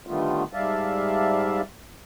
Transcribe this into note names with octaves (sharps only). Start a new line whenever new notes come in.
D3 D#3 G3 A3 B3 F4
G#2 G3 D5 E5 F5 A5